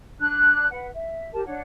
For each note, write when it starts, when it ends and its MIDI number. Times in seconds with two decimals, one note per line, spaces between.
0.20 0.66 62
0.20 0.66 90
0.71 0.87 71
0.71 0.87 78
0.94 1.30 76
1.33 1.43 67
1.33 1.43 70
1.33 1.43 81
1.45 1.60 62
1.45 1.60 73
1.45 1.60 78